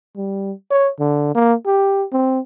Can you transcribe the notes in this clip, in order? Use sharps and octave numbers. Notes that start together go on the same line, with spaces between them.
G3
C#5
D3
A#3
G4
C4